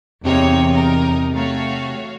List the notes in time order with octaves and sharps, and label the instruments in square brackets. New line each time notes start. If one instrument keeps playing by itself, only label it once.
[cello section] E2 [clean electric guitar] C3 G4 [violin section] A#3 D#4 C#5
[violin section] D#4 A#4
[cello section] A3 [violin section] F#4 C#5 F5